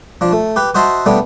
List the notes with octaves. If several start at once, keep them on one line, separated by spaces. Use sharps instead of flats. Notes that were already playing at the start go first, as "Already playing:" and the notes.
F3 D4
A3
G4 B4
F#4 C5 D#5 E5 A5 C6
G3 A3 B3 D4